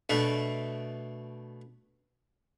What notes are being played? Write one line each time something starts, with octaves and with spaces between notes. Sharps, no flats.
B2 A3 D4